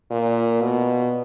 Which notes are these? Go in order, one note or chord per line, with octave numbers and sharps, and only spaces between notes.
A#2
B2